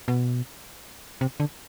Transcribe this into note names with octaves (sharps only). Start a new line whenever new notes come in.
B2
C3
D3